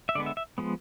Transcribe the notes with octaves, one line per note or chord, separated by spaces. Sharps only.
E5
D3 G#3 B3 D5
E5
E5
F3 G#3 B3